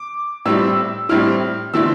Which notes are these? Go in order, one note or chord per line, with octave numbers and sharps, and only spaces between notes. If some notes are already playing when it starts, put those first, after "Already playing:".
Already playing: D6
A2 G3 C4 E4 E6
A2 G3 C4 E4 F6
D3 A3 C4 E4 E6